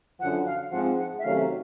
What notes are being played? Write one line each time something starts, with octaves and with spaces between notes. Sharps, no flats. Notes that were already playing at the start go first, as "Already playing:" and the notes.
F#2 D3 F3 F#5
F5
G#2 F3 G#3 C4 F#5
F#5
E5
C3 D#3 F#3 A3 C#4 F5